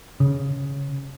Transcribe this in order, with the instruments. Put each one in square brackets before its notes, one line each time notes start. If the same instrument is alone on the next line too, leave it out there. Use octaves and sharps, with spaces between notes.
[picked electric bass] C#3